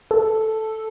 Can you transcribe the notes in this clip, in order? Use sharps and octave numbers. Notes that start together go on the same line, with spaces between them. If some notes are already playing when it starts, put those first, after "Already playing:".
A4